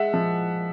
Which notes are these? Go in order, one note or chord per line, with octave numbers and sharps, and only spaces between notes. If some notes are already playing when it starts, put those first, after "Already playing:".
Already playing: G#3 E5 F#5
F3